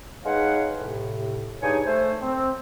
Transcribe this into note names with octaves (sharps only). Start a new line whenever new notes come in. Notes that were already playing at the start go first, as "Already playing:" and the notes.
G#3 D#4 B4 C#5 F5 F#5
A2 C3
G2 D#4 G#4 C#5 G#5
A3 C5
C4